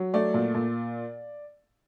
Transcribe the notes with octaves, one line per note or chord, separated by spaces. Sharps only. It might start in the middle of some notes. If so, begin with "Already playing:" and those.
Already playing: F#3
A3 D5
A#2
A#2